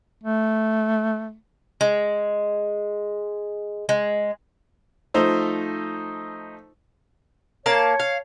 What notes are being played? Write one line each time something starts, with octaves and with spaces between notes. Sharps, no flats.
A3
G#3
G#3
F3 A3 D#4 C5 E6
A#3 C#5 F5 A5
F5